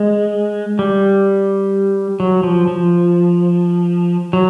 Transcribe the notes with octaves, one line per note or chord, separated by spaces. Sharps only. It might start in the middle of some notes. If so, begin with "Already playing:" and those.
Already playing: G#3
G3
F#3
F3
F3
F#3